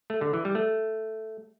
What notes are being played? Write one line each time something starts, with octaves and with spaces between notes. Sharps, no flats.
A3
D3
E3
G3
A3